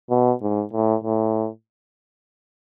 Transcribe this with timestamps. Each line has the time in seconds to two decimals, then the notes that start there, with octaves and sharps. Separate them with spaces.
0.10 B2
0.42 G#2
0.73 A2
1.04 A2